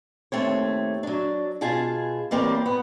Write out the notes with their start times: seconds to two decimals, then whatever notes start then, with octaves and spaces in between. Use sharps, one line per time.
0.32 D#2 A3 C4 C#5
1.03 F#3 D4
1.61 B2 F4 G#4 G#5 A5
2.31 E3 G3 A#3 C4 G4 C#5
2.66 B3